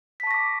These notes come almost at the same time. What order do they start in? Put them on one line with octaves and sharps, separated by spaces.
B6 A5 C#6 A#6 D6